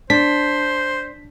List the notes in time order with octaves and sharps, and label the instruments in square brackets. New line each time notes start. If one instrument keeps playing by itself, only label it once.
[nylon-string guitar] D4 [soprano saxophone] C5 [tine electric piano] B6